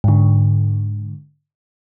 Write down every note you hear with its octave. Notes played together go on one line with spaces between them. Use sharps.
G#2 D3